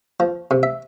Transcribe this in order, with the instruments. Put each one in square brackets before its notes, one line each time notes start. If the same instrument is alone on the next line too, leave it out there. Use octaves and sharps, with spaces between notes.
[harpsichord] F3
C3
E5